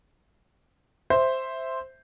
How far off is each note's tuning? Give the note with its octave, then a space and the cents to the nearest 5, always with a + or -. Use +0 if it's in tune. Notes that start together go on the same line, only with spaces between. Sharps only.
C5 +0 E5 +0